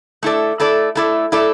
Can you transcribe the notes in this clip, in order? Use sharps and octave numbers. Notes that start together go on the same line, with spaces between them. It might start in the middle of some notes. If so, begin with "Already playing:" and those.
A3 E4 A4 D5
A3 E4 A4 D5
A3 E4 A4 D5
A3 E4 A4 D5